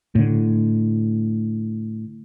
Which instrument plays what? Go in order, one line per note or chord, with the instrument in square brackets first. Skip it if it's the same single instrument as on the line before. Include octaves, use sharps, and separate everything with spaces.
[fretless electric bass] A2 D3